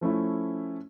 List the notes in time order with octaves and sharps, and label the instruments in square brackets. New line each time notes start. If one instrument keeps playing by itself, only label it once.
[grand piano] F3 A3 C#4 E4